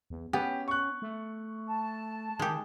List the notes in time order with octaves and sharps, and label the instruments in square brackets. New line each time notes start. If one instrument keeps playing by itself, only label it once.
[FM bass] E2
[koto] B3 [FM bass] C#4 [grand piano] G4
[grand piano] C#6 F#6
[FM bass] A3
[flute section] A5
[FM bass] D#3 [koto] G#3 G4